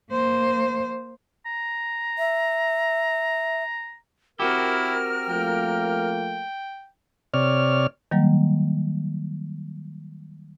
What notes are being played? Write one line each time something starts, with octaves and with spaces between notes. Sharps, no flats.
A#3 C5
A#5
E5
C4 E4 F#4 G4 A#4 F6
F3 A3 A#3 G5
C3 C#5 D5 F6
D#3 F#3 G3 A#3